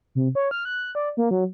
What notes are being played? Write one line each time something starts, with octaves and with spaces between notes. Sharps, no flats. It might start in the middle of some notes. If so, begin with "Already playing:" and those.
C3
C#5
F6
F#6
D5
A#3
F#3